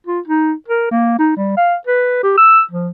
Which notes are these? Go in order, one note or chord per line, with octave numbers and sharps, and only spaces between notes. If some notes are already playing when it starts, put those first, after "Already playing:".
F4
D#4
A#4
A#3
D#4
G3
F5
B4
G4
E6
F3